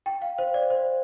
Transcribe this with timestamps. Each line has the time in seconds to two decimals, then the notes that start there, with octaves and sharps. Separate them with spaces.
0.06 G5
0.22 F5
0.38 C5
0.54 D5
0.70 C5